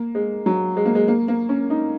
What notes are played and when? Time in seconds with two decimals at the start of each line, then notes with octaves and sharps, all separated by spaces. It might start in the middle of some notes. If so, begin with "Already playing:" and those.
Already playing: A#3
0.15 G#3
0.46 F#3
0.77 G#3
0.86 A#3
0.95 G#3
1.08 A#3
1.28 A#3
1.49 C#4
1.70 D#4